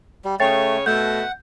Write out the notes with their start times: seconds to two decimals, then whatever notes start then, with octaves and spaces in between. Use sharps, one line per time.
0.25 G3
0.40 C#3 A3 C#5 G5 A6
0.86 B2 A3 F#5 G6